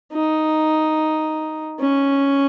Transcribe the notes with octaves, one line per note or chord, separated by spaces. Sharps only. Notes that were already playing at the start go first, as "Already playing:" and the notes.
D#4
C#4